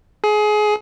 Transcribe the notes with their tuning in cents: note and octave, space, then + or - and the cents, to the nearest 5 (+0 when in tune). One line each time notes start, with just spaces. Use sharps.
G#4 +25